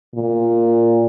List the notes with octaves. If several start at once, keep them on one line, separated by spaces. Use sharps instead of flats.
A#2